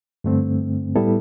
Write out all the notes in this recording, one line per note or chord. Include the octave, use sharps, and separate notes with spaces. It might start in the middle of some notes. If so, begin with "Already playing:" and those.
G2 D3 A3 C4
A2 G3 B3 E4 A4